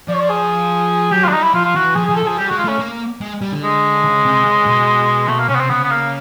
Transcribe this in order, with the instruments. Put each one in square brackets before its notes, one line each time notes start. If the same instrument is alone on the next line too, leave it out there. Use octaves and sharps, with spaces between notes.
[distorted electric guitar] F3 [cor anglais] D5
[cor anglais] C#5
D5
G#4
[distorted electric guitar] F#3 [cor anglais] G4
[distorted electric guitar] G#3 [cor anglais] F4
[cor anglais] D4
[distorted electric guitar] G3 [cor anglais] D#4
[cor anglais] E4
[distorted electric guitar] F3 [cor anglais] F4
[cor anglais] F4
[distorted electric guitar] E3 [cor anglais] F#4
[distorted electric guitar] F3 [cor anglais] G#4
[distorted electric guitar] F3 [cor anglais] G#4
[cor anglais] A4
[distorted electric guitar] F3 [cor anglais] G#4
[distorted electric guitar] G3 [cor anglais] G4
[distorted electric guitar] G#3 [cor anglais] F#4
[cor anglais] F4
[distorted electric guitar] A3 [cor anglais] C#4
[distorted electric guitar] A#3
G#3
G3
D3
[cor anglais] G#3
[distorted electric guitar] C#3
C3
C#3
B2
[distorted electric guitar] B2 [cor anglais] A3
[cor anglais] A#3
[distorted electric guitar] C3 [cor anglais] C#4
[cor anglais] B3
C4
[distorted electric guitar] C#3 [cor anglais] B3
[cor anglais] B3
A#3